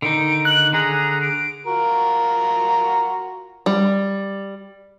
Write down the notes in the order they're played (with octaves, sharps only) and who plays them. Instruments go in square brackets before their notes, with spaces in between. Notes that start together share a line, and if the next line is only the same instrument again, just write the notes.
[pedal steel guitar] D3 D#3 D#4 [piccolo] D7
[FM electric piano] F#6 [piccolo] F#7
[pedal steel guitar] D3 G#4 [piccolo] A#5
[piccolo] D7
[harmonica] F4 F#4 A#4
[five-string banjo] G3